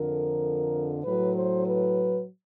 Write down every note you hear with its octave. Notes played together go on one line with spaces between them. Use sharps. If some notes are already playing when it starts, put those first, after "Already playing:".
Already playing: F2 D3 F3 A#4
A2 F#3 B4
C5
B4